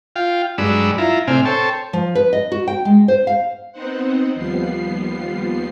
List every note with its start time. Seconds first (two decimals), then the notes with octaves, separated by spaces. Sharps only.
0.16 F4 F5 G5
0.58 G2 F#3 G#3 D4 B5 E6
0.98 E4 F4 A#5
1.27 A2 C3 C4 D4 G#5 F6
1.45 A4 C5 C#5 G5 A5
1.93 F3
2.15 B4
2.33 D#5
2.52 F#4
2.68 G5
2.85 G#3
3.08 C5
3.27 F5
3.72 B3 C4 D#4 C5 F#5
4.34 D#2 F3 G3 B3 C7